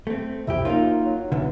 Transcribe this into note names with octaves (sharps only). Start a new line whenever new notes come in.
A3 C4
C2 F2 E4 G4
F#2 A#3 D#4 F4
F#3
B1 D3 E3